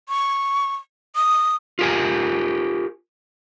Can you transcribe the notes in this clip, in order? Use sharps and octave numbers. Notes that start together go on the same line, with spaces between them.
C#6
D#6
F4 G4 A#4 G#5